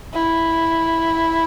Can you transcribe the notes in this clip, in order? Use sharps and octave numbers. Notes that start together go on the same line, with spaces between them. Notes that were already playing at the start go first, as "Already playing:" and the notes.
E4